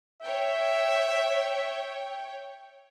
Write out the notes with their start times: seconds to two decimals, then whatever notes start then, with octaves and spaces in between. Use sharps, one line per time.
0.22 C#5 E5 G5